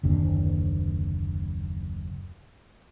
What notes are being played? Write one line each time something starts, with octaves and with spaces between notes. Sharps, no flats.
F#1 D#2 D3